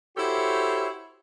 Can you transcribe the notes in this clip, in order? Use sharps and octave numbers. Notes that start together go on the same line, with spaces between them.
E4 F#4 G4 A4 C5 C#5